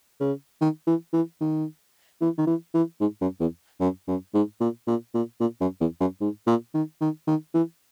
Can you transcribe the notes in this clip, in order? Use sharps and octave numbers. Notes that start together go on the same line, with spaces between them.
C#3
D#3
E3
E3
D#3
E3
D#3
E3
E3
G#2
F#2
E2
F#2
F#2
G#2
A#2
A#2
A#2
A#2
F#2
E2
F#2
G#2
A#2
D#3
D#3
D#3
E3